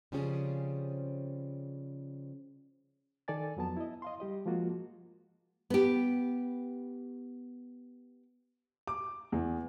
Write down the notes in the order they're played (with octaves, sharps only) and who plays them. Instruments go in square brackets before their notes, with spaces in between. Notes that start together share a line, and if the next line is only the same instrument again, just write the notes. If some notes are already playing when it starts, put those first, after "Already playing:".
[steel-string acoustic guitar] C#3 F3 G3 C4 C#4 G#4
[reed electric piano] D#3 A4 D5 G#5 A6
F2 F#3 B3 A5
E4 D#5
D#5 F5 C6
G3 G4 D#5
F3 G#3 A#3 F4 F#4
[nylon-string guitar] B3 G4
[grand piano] D6
E2